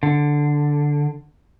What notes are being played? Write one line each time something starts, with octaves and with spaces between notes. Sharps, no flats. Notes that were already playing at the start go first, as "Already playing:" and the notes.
D3